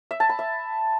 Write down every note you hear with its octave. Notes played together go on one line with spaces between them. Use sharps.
E5
A5
B5
E5